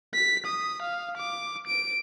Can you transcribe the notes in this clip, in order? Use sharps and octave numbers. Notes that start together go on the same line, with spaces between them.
B6
D#6
F5
D6
D7